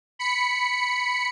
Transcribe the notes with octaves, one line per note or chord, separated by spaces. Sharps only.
B5 C#7